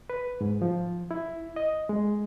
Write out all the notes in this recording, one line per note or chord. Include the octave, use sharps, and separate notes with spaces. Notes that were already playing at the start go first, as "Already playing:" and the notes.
B4
G#2
F3
E4
D#5
G#3